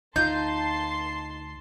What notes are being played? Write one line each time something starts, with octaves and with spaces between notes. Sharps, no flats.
D2 D#4 F4 A5 C6 G6 C7